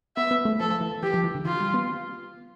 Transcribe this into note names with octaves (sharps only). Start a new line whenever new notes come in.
B3 E5
B3
A3
F3 A4
F3
E3
E3 G4
F3
E3
D3
E3 F4
G3
B3